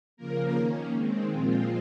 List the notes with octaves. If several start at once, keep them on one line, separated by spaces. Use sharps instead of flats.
C#3 F3 A#3 A#4
D#3 A#3 C#4
D#3 G#3 C4
A#2 F3 G#3 C4 F4